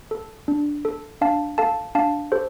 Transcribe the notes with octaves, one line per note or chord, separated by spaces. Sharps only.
A4
D4
A4
D4 F5 A5
A4 F5 A5
D4 F5 A5
G4 A4 C5